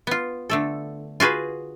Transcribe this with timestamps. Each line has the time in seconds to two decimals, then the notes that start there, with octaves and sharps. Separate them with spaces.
0.07 B3 F4
0.50 D3 A3 A4
1.20 F4 F#4 G#4 B4